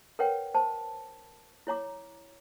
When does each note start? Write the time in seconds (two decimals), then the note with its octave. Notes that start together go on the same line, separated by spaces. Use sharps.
0.19 A#4 B4 C#5 F#5 G5
0.54 C5 A5
1.67 E4 C#5 A#5 D6